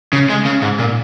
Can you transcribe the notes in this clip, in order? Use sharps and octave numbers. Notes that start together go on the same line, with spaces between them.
C#3
G#3
C#3
G#2
A#2